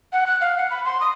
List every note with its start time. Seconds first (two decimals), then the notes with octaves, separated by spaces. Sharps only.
0.12 F#5
0.27 F#6
0.41 F5
0.57 F#5
0.70 B5
0.84 C6
1.01 D#6